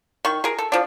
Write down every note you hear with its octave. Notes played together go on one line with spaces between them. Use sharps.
D#3 C#6
G#4 A#4
A4
F3 D4